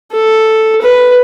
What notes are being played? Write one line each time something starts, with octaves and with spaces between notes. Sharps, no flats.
A4
B4